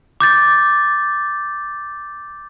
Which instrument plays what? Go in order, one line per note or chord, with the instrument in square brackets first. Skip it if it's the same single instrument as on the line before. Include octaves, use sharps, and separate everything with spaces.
[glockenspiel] D6 G6 A6